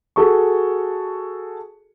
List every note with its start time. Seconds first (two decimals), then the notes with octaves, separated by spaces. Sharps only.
0.16 F#4 G#4 A4 C#6